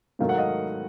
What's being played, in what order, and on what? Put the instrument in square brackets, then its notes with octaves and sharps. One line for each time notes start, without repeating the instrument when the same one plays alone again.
[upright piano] G#2 D#3 F#3 A3 F5
F#5
D#5 F5